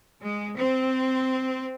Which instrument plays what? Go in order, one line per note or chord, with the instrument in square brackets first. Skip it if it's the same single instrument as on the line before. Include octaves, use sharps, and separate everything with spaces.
[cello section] G#3
C4